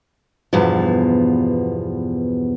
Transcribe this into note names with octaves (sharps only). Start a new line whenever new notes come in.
E2 G2 B2 F3